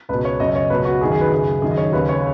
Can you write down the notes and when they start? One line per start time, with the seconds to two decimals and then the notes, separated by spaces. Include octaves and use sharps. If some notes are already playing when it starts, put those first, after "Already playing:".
0.09 C#2 B2 B4
0.25 C#5
0.40 F#2 C#3 D#5
0.51 D#5
0.56 C#5
0.70 C#2 B2 B4
0.85 F#4
1.00 F#2 G#4
1.04 D#3
1.12 G#4
1.21 B4
1.31 F#2 C#3 G#4
1.62 F#2 D#3 G#4
1.71 D#5
1.77 C#5
1.92 D#2 C#3 B4
2.09 C#5